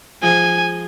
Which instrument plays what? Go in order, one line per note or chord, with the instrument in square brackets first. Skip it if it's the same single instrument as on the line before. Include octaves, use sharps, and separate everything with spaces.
[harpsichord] F3 G#3 [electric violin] G#5